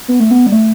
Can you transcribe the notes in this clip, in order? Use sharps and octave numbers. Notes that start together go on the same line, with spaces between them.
B3
A3
B3
G3
A3